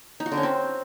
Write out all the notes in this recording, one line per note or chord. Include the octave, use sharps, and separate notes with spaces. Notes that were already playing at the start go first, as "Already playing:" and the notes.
D#4
F#4
D3
C#4
C4